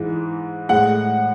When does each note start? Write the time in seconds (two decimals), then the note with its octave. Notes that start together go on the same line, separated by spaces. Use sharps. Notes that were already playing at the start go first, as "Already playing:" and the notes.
Already playing: G#2 E3 G#3
0.69 A2 G#3 F#5